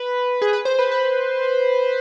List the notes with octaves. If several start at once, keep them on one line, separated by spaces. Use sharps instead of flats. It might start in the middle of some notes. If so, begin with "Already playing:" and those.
Already playing: B4
G#4
B4
C5
B4
B4